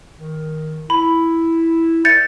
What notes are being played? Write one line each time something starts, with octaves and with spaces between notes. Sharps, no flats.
D#3
E4 B5
A#4 D5 E5 G6 A6 C#7